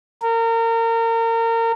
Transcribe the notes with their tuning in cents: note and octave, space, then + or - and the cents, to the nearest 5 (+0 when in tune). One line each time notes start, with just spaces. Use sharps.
A#4 -30